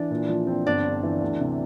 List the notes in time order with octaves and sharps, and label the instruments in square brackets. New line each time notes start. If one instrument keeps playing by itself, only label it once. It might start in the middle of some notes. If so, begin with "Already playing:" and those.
Already playing: [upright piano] E3 [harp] D4 D5
[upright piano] A#2
F3
C4
[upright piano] G1 [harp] D4 D5
[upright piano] G2
E3
D2
C3